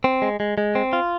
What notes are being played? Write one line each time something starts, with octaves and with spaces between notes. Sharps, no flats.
C4
G#3
G#3
G#3
C4
F4